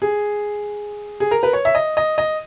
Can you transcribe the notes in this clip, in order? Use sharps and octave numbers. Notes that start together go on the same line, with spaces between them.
G#4
G#4
A#4
B4
C#5
E5
D#5
D#5
D#5